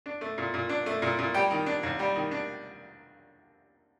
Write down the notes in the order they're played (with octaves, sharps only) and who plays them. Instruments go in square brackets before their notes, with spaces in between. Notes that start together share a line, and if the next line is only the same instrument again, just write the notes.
[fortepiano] D4
A3
A#2
A#2
D4
A3
A#2
A#2
G3 G4
D#3
D4
D#2
G3
D#3
D4